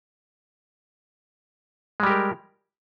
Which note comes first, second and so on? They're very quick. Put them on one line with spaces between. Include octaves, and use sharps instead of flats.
G#3 G3 G4 A#4